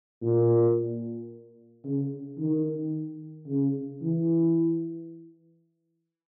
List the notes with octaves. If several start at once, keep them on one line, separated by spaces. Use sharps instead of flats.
A#2
C#3
D#3
C#3
E3